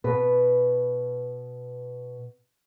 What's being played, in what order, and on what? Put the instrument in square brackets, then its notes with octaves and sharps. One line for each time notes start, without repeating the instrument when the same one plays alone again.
[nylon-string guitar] B2 B4